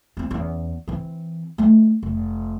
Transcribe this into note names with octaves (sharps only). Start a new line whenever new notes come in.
C4 D#4
E2 C#4
E3 C4
A3 D#4
F1